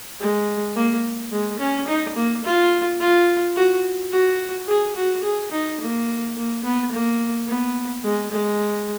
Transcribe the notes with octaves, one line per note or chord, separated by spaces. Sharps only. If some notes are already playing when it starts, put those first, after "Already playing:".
G#3
A#3
G#3
C#4
D#4
A#3
F4
F4
F#4
F#4
G#4
F#4
G#4
D#4
A#3
A#3
B3
A#3
B3
G#3
G#3